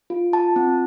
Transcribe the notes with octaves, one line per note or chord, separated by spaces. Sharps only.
F4
F4 A5
C4